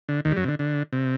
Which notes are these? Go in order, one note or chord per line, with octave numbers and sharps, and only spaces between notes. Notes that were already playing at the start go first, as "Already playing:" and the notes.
D3
D#2 D#3
G3
F#2 F#3
C3
D3
D3
C3